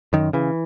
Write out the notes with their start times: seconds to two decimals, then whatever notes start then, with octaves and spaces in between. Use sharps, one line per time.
0.13 F#2 D#3
0.33 C#3 E3